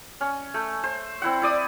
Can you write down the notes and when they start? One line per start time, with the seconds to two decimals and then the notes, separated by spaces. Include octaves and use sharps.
0.21 C#4
0.54 A3
0.84 C5
1.22 C4 E4 F#5
1.42 E4 D5 D#6